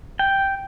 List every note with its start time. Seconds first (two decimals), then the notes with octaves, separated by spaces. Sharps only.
0.19 G5